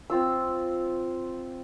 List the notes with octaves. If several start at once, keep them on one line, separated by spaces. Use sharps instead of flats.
C4 F4 E6